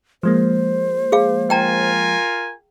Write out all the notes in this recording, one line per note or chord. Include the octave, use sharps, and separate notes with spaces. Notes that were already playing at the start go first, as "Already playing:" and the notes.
F3 G#3 A#3 C5
G#4 F5
F4 A#4 G5 G#5 A#5